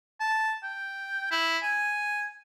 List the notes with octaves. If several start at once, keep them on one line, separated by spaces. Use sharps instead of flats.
A5
G5
E4
G#5